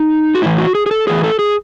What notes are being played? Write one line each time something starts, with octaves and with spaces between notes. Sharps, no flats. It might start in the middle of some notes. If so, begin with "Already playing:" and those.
Already playing: D#4
F#4
A2 E3 E4
F#4
G#4
G#4
A4
A2 E3 G#4
A4
G#4